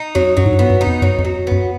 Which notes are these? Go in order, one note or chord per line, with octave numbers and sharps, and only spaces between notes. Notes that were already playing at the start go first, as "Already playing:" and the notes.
Already playing: D#4
F2 F#3
F#2 F#3
G#2
G2
B3
F#2
D#4
F2
F#2 F#3
F2
F#3
F#2 B3